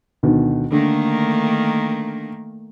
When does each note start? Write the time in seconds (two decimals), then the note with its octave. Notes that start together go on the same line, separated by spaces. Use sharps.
0.23 D2 B2 D#3
0.72 D3 D#3 A3 A#3